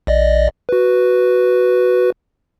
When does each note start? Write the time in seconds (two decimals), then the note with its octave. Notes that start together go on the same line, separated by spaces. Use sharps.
0.07 A#1 D5 D#5
0.69 F#4 B4